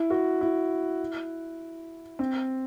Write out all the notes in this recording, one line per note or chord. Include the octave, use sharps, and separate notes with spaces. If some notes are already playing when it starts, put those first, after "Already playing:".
Already playing: E4
F#4
E4
C4